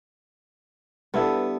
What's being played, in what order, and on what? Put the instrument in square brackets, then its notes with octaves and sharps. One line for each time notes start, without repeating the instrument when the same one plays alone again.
[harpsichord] G2 [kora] B3 E4 A4